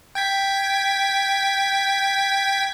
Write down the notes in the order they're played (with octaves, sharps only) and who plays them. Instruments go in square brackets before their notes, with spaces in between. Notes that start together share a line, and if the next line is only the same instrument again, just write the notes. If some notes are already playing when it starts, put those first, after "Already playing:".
[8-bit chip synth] G5 G#6 B6